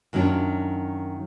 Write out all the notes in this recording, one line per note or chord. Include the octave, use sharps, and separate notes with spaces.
F#2 D#3 F#3 C#4 D4 F4